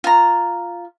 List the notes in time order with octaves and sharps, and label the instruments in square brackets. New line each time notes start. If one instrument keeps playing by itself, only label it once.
[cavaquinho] F4 A#5